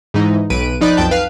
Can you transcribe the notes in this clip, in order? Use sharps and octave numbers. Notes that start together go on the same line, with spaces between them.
G#2 E3 D#4
B1 B4 D7 D#7
F3 D#4 D5 B5 F#6
B1 F2 G5 A5
B4 F5